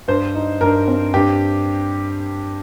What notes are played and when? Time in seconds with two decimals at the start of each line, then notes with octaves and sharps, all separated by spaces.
0.08 G2 C5
0.35 D#4
0.61 G2 A#4
0.88 C4
1.13 G2 G4